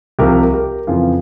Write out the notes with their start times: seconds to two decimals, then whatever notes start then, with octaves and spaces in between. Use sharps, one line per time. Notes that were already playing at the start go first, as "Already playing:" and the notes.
0.19 C2 C3 F3 G4 A#4
0.53 G4 A#4
0.87 F2 C#3 E3 F4 G#4